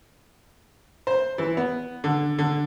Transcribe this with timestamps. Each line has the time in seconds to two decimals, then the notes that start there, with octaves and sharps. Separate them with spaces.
1.07 C5
1.38 E3
1.57 B3
2.04 D3
2.39 D3